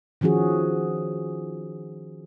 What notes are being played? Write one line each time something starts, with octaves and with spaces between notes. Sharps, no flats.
D#3 F3 C#4 F#4 G#4